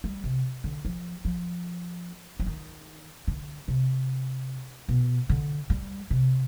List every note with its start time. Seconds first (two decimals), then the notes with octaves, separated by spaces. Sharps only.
0.04 G3
0.24 C3
0.64 D3
0.85 F3
1.25 F3
2.40 F3
2.46 D#3
3.28 D3
3.68 C3
4.89 B2
5.29 D3
5.70 G3
6.10 C3